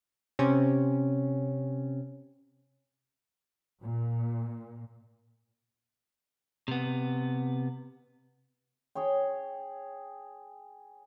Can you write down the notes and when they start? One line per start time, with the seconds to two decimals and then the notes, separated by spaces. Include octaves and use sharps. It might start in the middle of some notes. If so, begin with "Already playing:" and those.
0.39 C3 C#4
3.83 A#2
6.68 C3 B3
8.95 G#4 C#5 G5